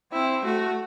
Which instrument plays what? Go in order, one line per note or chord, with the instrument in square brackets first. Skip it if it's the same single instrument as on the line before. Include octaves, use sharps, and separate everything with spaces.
[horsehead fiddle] C4 [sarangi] E4
[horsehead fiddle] A3 [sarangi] F#4